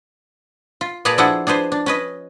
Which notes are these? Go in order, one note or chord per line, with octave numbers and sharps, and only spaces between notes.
F4
A#2 G#4 B4 D5 A5 A#5
F3 D4 E4 G#4 A4 F#5
D4 G#4 B4 C5
D4
C#4 B4 D#5